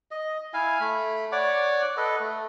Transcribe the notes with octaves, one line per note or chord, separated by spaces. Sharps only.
D#5
E4 F5 G#5
A3 B5
C#5 D5 F#5 D6
A4 B4 D#5
A3